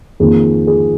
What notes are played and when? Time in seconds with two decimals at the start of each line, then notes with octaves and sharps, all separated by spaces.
0.20 F2 D#3 A#3 G#4
0.67 G#4